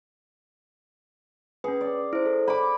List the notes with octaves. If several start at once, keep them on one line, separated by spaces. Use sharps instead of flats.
C#4 G#4 B4
D5
E4 C5
A4
D5 B5 D6